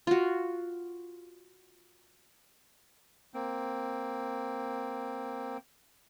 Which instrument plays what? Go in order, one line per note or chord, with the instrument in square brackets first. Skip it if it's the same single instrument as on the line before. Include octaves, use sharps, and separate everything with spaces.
[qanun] F4 F#4
[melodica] A#3 C4